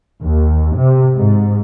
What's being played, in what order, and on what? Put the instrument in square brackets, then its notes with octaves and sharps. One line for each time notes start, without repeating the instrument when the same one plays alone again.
[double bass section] D#2
C3
G#2